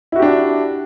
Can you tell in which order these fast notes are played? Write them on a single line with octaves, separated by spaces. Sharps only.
E4 F#4 G4 D4